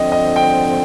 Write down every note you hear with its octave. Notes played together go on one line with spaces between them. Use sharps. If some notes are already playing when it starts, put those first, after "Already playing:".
Already playing: D3 F3 C4 D#5
D#5
G5